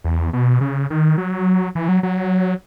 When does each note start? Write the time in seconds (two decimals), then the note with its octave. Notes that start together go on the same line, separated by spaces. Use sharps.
0.04 E2
0.33 B2
0.61 C#3
0.90 D#3
1.18 F#3
1.75 E3
1.88 F#3
2.03 F#3